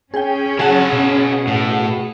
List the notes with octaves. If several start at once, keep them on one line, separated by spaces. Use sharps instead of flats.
C#4 G#4 G5
C#3 F#3 G#4 F#5 A5
B2
A2